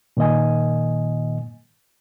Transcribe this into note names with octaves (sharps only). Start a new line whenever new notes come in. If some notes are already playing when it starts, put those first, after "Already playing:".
A#2 D#3 A#3 D#5 G#5